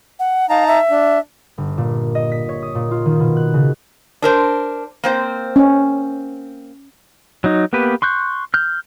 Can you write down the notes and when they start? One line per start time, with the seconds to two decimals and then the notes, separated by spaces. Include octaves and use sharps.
0.19 F#5
0.50 D#4 F5 A5 A#5
0.67 E5
0.90 D4
1.58 G1
1.78 A#2
2.15 D#5
2.31 B6
2.49 C#5
2.62 D#6
2.75 A#2
2.91 F4
3.05 D#3
3.20 B2
3.36 F#6
3.54 C#3
4.22 D4 A#4 C5
5.04 A#3 C4 C5
5.56 C#4
7.44 F#3 D#4
7.73 A#3 B3 G4 B4
8.02 C6 C#6 F#6 G6
8.54 F6 G6